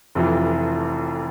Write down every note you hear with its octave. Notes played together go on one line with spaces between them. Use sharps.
F1 F2 E3